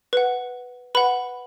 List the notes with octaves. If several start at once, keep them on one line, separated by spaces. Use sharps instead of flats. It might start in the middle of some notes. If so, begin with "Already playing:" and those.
B4 F#5
B4 F#5 B5